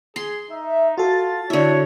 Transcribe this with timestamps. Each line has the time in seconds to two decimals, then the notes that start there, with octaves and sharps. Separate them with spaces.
0.16 G#4 C6
0.50 D#4 E5
0.97 F4 F#4 A4 A6
1.50 D3 E4 C#5 E5